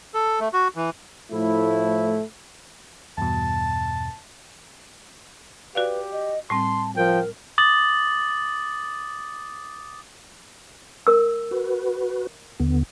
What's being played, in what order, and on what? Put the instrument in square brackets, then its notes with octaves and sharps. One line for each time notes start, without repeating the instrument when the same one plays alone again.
[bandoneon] A4
A3
F#4
E3
[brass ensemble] A2 F3 E4 [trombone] A3
[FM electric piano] E2 G2 B2 [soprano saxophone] A5
[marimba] F#4 D5 F5 [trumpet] G4 [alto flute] B4
[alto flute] D#5
[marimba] A2 G3 C4 [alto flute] A5 [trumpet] C6
[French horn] F3 [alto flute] A#4 [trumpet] G5
[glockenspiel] D6 D#6 A6 F#7
[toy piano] A#4 E6
[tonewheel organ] F#4 B4
D#2 D3 B3